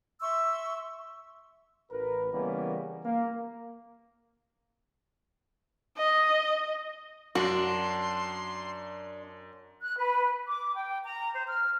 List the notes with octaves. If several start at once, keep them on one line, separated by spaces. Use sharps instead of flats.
E5 C6 C#6 E6
A1 A#4 B4
C#3 E3 G3 A#3 B3 C#4
A#3
D#5
F#2 D4 F#4 C6
F#6
B4
D6
G5
A#5
C5
F6